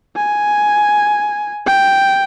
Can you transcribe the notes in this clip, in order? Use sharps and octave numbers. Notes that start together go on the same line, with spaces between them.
G#5
G5